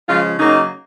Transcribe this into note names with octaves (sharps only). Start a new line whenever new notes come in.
C#3 F3 G#3 F4
C#3 F#3 A#3 D#4